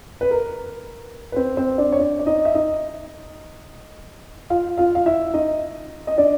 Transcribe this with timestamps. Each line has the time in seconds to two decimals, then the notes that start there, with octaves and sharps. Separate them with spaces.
0.21 B4
0.31 A#4
1.32 B4
1.36 C4 C5
1.57 C4 C5
1.78 D4 D5
1.92 C#5
1.99 D4 D5
2.19 D5
2.26 D#4 D#5
2.45 E5
2.55 D#4 D#5
4.50 F4 F5
4.78 F4 F5
4.95 F5
5.06 E4 E5
5.34 D#4 D#5
6.07 D#5
6.18 D4 D5